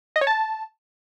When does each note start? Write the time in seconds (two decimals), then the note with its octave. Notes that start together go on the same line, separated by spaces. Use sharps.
0.16 D#5
0.21 C#5
0.27 A5